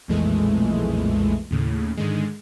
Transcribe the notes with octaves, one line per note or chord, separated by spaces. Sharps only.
B1 F2 A#2 E3 G#3 A3
D#2 A2 C#3
G#2 D3 D#3 G#3